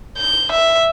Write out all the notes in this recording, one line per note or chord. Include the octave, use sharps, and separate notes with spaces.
G6
E5